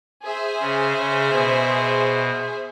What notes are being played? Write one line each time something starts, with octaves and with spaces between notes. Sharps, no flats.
G#4 C5 E5
C#3
C#3
B2